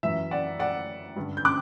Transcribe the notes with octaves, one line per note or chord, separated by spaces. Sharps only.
F#2 E3 E5
D5 F#5
D5 F#5
G2 D3
G6
D6 F#6